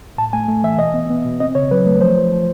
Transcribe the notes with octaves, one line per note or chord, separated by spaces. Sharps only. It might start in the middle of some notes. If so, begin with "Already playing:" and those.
A2 A5
A3 G#5
A3
E3 E5
B2 D#5
B3
B3
B2
C4 D#5
C#3 C#5
F#3 B4
A3
F3 C5
F3
F3